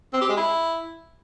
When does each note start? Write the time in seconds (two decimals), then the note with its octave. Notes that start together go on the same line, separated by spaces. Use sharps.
0.14 C4
0.21 G4
0.29 G#3
0.37 E4